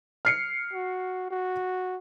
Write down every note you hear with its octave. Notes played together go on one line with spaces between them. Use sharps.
F6 C7 C#7
F#4
F#4